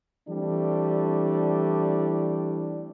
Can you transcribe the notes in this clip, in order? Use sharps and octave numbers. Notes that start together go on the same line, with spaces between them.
E3 G3 A3 C4 D4